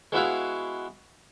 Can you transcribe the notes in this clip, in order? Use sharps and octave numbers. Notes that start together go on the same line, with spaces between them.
G#3 B3 E4 F#4 E5 F5